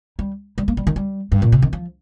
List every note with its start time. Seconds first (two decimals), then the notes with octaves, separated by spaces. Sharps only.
0.19 G3
0.58 G3
0.68 A#3
0.77 G3
0.87 D#3
0.96 G3
1.32 G2
1.42 A#2
1.52 C3
1.62 D#3
1.73 F3